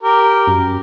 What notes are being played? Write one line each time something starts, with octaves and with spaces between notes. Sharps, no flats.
G4 A#4
F#2